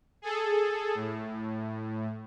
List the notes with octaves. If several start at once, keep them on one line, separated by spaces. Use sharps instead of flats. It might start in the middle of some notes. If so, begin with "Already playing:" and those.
G#4 A4
A2